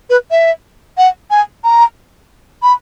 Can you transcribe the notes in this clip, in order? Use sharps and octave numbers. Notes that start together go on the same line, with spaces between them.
B4
E5
F#5
G#5
A#5
B5